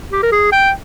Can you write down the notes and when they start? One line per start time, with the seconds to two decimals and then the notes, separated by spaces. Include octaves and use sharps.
0.12 G4
0.23 A#4
0.32 G#4
0.52 G5